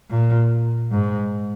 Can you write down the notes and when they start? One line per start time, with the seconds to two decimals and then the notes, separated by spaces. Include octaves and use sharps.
0.10 A#2
0.91 G#2